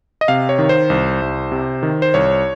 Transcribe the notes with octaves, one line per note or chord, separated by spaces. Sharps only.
D#5
C3 F5
C#5
D#3
C5
C2
C2
C3
D#3
C5
C2 C#5